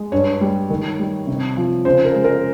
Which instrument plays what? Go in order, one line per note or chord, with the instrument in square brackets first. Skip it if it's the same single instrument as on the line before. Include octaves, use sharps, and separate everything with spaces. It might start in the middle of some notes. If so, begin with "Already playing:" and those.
Already playing: [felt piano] G#3
G2 C#5
G3
D#3
G3
C3
F3
C#3 C5
A#4
G#3
A#4